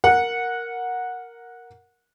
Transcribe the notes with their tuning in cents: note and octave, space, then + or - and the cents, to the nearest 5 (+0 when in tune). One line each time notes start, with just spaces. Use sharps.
A#4 +0 F#5 -15